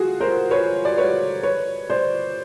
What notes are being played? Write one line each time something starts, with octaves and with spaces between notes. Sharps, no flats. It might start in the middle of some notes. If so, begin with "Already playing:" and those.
Already playing: F4 F#4 G#4
A#4 C5
B4 C#5
D5
B4 C#5
B4 C#5
C5 D5